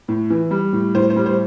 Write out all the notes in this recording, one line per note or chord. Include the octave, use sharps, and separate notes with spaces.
A2
E3
G3
A2
A2 C5
C5
G3
C5